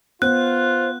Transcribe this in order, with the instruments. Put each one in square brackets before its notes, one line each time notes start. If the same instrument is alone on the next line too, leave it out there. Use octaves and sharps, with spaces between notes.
[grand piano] B3 [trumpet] F4 [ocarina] C5 [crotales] F#6